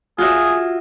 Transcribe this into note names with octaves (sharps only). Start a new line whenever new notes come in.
F4 F#4 G#4 E5